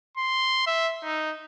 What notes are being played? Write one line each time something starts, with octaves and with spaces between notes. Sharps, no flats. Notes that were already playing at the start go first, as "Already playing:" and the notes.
C6
E5
D#4